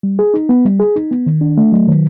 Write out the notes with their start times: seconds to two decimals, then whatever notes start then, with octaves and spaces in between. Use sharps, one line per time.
0.03 G3
0.19 G#4
0.34 D#4
0.49 B3
0.65 G3
0.80 G#4
0.96 D#4
1.11 B3
1.26 D#3
1.41 D4
1.57 A3
1.72 F#3
1.87 D#3